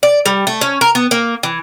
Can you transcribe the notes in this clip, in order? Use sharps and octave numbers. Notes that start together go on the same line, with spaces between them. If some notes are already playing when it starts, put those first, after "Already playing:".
D5
G3
A3
C#4
A#4
B3
A#3
E3